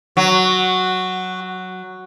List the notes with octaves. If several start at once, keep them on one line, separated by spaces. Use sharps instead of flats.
F#3 F#4